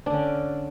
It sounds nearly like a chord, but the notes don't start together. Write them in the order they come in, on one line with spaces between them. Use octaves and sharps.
D4 D3 C#4